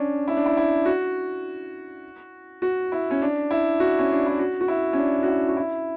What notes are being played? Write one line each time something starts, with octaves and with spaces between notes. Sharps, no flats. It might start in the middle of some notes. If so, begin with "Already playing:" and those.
Already playing: C#4 D4
E4
D4
E4
E4
F#4
F#4
E4
C#4
D4
E4
F#4
C#4
D4
E4
F#4
F#4
E4
C#4
D4
F#4
E4
F#4
E4